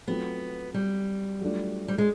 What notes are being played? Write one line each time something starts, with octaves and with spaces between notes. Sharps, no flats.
F#3 A3 B3 C4 F4
G3
F#3 A3 D4 F4
G3
G#3